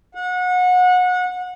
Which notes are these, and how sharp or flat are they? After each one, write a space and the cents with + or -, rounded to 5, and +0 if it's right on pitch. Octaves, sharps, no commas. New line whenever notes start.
F#5 -30